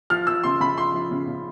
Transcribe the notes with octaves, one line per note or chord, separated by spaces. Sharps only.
F3 F6
F3 E6
C#3 C6
C#3 B5
F3 C6
F3
C#3
C#3